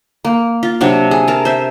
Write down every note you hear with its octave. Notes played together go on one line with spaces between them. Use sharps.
A#3
F4
C3 F#3 C4 D4
G#4
A#4 A5
C5 E5